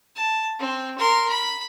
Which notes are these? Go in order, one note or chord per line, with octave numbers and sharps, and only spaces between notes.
A5
C4
A#4 C6
B5